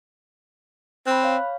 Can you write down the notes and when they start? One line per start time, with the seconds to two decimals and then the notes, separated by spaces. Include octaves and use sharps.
1.07 C4 B5 F#6
1.23 C#5 F5